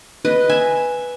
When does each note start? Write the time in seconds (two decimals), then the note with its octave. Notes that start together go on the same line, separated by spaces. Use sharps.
0.25 B4 D#5
0.49 E5 G#5